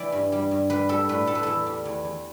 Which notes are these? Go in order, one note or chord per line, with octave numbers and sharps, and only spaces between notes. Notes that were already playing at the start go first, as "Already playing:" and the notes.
Already playing: E3 D5 E5 G5
G2
G3
G2
G3 B4
G3 A4
A2 B4
G3 A4
B4
E2 A4
G3
E2
E2